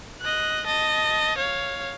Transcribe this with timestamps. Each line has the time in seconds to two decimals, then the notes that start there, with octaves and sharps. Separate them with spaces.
0.21 D#5 F#6
0.67 D#5 A5
1.38 C#5 F5